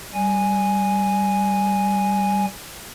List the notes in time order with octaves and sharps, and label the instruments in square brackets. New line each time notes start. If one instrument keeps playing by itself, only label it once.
[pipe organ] G3 G#5